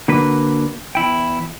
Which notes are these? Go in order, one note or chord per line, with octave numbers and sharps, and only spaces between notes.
D3 A#3 D4 F#4 B4
E2 E4 G5